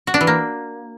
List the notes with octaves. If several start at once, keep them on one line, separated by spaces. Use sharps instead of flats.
F#4
D4
E3
A#3